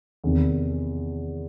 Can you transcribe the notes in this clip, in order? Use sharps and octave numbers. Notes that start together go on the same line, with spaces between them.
E2 C3 D#3